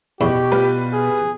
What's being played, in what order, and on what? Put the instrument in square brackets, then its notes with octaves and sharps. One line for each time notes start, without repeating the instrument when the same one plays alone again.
[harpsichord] E2 [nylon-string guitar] B2 [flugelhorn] G4 [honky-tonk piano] B5 C#6
[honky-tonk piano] G3 F4 B4
[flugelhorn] G#4